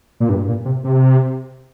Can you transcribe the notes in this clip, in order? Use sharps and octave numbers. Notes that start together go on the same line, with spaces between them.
A#2
G2
A#2
C3
C3